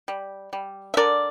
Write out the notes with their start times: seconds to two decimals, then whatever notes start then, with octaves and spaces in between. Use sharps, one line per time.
0.08 G3
0.53 G3
0.94 E5
0.97 D3 A#4 D5